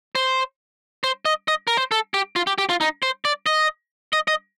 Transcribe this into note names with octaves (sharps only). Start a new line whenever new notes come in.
C5
C5
D#5
D#5
A#4
C5
A4
G4
F4
G4
G4
F4
D#4
C5
D5
D#5
D#5
D#5